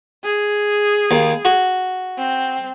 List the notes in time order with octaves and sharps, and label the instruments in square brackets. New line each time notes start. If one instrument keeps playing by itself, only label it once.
[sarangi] G#4
[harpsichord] D#2
F#4
[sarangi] C4